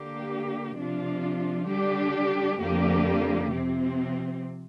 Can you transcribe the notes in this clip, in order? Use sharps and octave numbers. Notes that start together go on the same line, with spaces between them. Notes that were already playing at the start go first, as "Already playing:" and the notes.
Already playing: D3 A#3 G4
C3 F3 D4 F4
D3 G3 D4 G4
F2 D3 F3 A#3 G4
C3 F3 C4